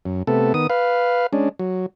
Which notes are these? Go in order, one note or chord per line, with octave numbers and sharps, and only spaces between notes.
F#2
C3 A3 B3 A4
D#3 B3 D#6
B4 F5
G#3 C#4 D4
F#3